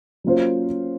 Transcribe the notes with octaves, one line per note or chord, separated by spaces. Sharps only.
F#3 A#3 C#4 F4 C5